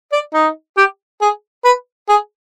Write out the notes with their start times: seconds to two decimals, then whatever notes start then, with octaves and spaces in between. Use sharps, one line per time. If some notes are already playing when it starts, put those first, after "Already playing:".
0.12 D5
0.34 D#4
0.77 G4
1.21 G#4
1.65 B4
2.09 G#4